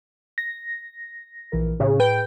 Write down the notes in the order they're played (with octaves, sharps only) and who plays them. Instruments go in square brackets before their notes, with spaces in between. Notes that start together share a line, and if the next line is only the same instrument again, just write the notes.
[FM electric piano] A#6
[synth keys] A#1 E3 A#4
[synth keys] A2 G#4 [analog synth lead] C#3
[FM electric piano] B4 [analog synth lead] G5